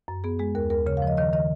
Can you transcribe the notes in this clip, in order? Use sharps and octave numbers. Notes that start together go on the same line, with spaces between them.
F#2
B3 G#4
G#3 G#4
D#2 A#4
D#2 A#4
C#3 C#5
F3 F5
D#5
D#3 D#5
D#3 D#5